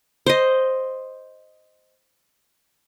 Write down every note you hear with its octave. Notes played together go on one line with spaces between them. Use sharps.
C5 D#5